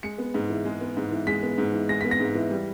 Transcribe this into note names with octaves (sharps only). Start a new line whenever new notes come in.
G#3 C#7
B3
G#2
E3
G#3
B3
G#2
E3
G#3 B6
B3
G#2
E3
G#3 A#6
B3 B6
A#6
G#2
E3
G3